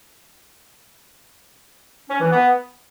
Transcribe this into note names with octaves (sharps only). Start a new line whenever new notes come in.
C#4
E3
B3